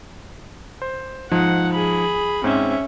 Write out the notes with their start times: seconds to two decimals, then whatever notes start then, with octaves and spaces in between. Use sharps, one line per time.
0.82 C5
1.31 G#2 F3 D#4 F#5
1.73 G#4 B5
2.44 G#2 C4 C#4 E5